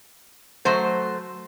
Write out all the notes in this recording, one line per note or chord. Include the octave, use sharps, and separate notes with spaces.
F#3 A3 C5